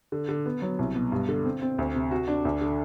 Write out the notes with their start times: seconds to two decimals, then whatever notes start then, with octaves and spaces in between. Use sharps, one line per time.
0.12 D3
0.29 D3
0.46 B3
0.62 F#3
0.79 C2
0.95 B2
1.12 G2
1.29 D3
1.45 C4
1.62 C4
1.78 D2
1.95 C3
2.11 F#4
2.28 D4
2.45 D2
2.61 D3